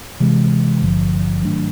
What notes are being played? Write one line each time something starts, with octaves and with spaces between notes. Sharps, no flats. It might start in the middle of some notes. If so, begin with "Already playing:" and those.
C3 E3 G#3
G#1 G2 D3 F3
G#2 D#3 F#3 A3 D4